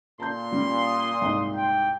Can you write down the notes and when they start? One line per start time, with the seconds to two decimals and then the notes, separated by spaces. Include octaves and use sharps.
0.20 A#2 A5 A#5 C6 G6
0.51 G3 C#4
0.84 D#6
1.22 C2 G#2
1.56 G5